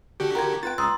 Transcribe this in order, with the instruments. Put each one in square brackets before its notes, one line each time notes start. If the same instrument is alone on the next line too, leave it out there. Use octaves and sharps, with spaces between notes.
[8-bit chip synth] D3 F#4 G4
[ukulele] F4 A#4 G5 [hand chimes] A#5 G#6
[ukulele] F4 B4 G5 [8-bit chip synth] A6
[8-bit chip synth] C#2 [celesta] A#5 D#6 E6 [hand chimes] C6 A6